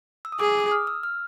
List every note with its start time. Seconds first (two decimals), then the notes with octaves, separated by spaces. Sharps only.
0.25 E6
0.32 D#6
0.40 G#4 D6
0.50 D6
0.60 D#6
0.72 F6
0.87 E6
1.03 F6